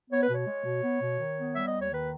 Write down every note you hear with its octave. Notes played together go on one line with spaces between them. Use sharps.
B3 C#5
B4
B2 C#5
G#3
B2
B3
B2
D#3
B3
G3 E5
D#5
D#2
C#5
D#3 B4